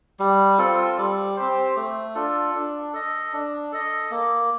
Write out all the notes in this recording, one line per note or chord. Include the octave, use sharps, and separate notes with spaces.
G3
C4 F4 A4
G3
C4 G4 C5
A3
D4 F4 A4
D4
A4 D#5
D4
A4 D#5
A#3